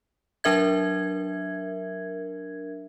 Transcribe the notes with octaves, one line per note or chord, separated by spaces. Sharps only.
F#3 D4 A#4 E5 G#6